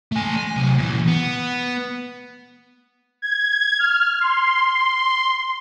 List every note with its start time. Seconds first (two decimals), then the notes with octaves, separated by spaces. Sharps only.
0.12 A3 G#5
0.37 G#5
0.56 C3 F#3
0.78 A#2 E3
1.08 B3
3.22 G#6
3.78 F6
4.21 C6
4.63 C6